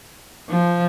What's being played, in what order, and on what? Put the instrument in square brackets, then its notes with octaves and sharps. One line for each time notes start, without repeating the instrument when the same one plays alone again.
[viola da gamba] F3